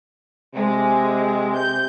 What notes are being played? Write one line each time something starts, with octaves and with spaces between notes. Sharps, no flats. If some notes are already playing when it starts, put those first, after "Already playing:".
C3 G#3
G6